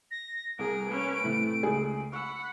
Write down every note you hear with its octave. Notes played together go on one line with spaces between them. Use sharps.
A#6
C2 G#4 A#4 D7
C#4 B4
A2 C3 E3 A3
C#2 G#4
F#5 B5 C#6 E6